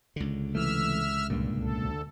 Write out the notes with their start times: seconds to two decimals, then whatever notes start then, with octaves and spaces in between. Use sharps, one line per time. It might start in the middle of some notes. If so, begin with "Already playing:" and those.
0.16 C#2 D3
0.55 C3 E3 A3 E5 E6 F6
1.30 C2 G2 A#2
1.60 D2 A4